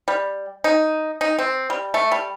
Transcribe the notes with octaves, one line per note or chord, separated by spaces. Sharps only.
G3
D#4
D#4
C4
G3
A3
G3